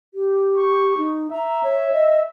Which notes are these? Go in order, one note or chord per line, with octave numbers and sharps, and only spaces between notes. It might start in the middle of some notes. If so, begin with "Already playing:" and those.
G4
C#6
D#4
E5 A#5
C#5
D#5